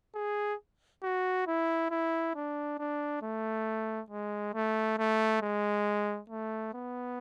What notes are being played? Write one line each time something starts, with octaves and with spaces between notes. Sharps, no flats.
G#4
F#4
E4
E4
D4
D4
A3
G#3
A3
A3
G#3
A3
B3